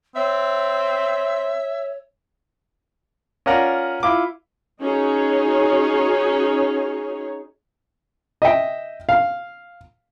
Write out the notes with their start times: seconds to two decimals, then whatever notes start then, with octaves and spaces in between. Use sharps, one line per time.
0.16 C4 C#5 E5
3.46 C#4 F4 A#4 D5 F#5 A#5
4.03 E4 F4 D6
4.82 C#4 D#4 F#4 G#4 C#5
8.42 D#5 E5 G5
9.09 F5